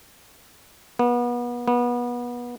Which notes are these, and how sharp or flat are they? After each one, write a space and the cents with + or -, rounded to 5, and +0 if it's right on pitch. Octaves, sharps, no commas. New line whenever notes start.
B3 -30
B3 -25